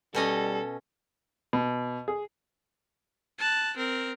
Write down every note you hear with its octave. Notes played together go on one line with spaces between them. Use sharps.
B2 G3 C#4 A4 D#5
B2
G#4
A5 F#6
C4 A#4